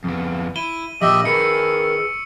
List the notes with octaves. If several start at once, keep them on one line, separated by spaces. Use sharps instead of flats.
F2 B3
E4 D#7 G7
A#2 F3 G4 D#5 E5 E6
D#3 G#4 B4 C#6 C#7